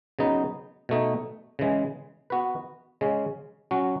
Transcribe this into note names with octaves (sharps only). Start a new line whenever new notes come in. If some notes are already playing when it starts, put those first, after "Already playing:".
C#3 F#3 B3 D#4
B2 A3 D#4
C#3 E3 G#3
B3 F#4 B4
C#3 G#3 C#4
F#3 C#4 F#4